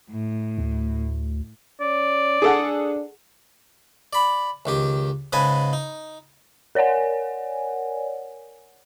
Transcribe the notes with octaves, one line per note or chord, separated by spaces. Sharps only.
A2
D2
C#4 D5
D4 G#4 A4 F#5
D5 B5
C#2 D#3 G4
G#2 C#3 B4 D#5 G#5 A5
D#4
A#4 C#5 D5 F#5 G#5